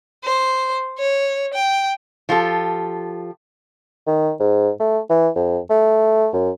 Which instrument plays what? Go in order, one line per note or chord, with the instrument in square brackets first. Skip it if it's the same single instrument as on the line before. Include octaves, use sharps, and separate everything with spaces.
[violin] C5
C#5
G5
[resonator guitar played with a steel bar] F3 F4 G4 A4
[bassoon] D#3
G#2
A3
E3
F2
A3
F#2